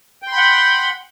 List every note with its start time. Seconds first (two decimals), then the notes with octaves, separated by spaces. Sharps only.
0.22 G5
0.27 C6
0.32 B5
0.37 F#5